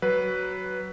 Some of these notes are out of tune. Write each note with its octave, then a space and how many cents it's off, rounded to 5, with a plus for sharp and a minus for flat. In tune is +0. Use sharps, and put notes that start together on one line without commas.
F#3 +15 B4 +0